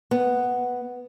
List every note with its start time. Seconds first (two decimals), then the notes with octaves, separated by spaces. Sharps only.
0.11 B3